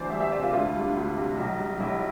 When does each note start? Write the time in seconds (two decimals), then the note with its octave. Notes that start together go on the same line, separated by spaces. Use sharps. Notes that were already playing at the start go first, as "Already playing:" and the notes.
Already playing: D2 E3 B4 C5 D5
0.10 G3 E5
0.20 E5
0.31 C3 D5
0.43 F4
0.53 D2 F4
0.67 E4
0.74 G3
0.81 D4
0.96 D2
1.16 C3
1.38 B1
1.59 G3
1.80 B1 E4